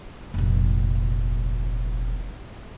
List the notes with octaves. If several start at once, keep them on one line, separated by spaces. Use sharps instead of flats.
F1 A#1